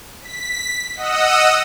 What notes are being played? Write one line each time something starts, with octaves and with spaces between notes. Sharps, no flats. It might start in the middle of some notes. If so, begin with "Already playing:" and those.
B6
D#5 F#5 D#6 E6